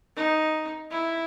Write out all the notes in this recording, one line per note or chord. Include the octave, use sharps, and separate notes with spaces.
D#4
E4